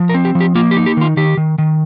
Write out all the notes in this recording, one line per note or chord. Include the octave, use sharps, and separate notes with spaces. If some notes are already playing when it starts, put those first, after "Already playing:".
Already playing: F3
A#4
C4
G4
F3
G4
A#3 F4
G4
D#4
G4
D#3 F4
D#3 G4
D#3
D#3